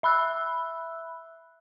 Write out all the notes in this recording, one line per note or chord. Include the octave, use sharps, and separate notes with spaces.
E5 B5 E6 F#6